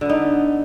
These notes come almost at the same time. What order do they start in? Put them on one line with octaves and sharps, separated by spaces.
D3 B3 D#4